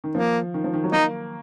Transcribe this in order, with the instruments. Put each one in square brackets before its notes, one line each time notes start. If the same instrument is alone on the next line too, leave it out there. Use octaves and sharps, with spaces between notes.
[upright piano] D#3
[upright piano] F3 [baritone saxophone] A#3
[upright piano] D#3
F3
D#3
F#3
[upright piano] A#3 [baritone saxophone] D#4